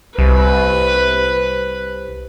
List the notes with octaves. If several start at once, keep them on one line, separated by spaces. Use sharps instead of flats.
C2 B4